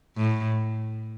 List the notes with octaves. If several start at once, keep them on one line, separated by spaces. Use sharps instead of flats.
A2